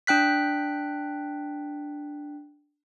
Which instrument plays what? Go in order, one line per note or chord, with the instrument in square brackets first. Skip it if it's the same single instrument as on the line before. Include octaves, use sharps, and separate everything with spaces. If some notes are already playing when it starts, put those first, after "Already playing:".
[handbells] D4 G5 F#6 B6